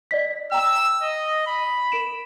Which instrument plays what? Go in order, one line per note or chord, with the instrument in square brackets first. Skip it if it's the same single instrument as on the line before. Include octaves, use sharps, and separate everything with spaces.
[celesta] D5 D#5 B6
[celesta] G5 A#5 [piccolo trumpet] E6
[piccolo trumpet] D#5
B5
[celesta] A#4 D7 E7